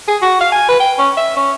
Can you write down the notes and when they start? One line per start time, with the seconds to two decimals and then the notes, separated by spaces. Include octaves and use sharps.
0.08 G#4
0.22 F#4
0.41 F5
0.52 G#5
0.69 B4
0.80 G5
0.99 C#4
1.17 E5
1.37 C#4